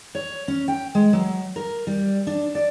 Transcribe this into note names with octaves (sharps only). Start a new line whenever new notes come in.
C#5
C#4
G5
G#3
F#3
A#4
G3
D4
D5